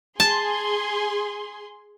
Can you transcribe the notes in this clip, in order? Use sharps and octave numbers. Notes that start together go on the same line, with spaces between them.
G#4 A5 C6